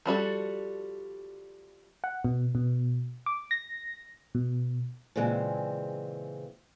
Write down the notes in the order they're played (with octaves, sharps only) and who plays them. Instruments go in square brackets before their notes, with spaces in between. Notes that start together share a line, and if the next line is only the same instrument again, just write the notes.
[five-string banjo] F3 G3 F#4 A4
[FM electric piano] F#5
B2
B2
D6
A#6
B2
[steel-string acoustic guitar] A#2 C#3 E3 G#3 C4